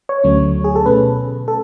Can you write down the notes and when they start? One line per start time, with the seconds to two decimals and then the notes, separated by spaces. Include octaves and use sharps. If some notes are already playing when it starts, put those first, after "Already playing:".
0.09 C#5
0.24 D2 D3 F#3 A3 C#4
0.64 G#4
0.76 A4
0.86 B2 A3 C#4 B4
1.48 A4